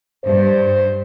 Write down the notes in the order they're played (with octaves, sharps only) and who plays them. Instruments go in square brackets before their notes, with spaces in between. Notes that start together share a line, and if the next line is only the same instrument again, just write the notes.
[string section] G2 [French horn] C5